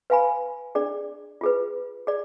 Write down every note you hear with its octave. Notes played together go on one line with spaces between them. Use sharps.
B4 F5 G#5 B5
D4 G#4 D5
F4 G#4 B4
G#4 D5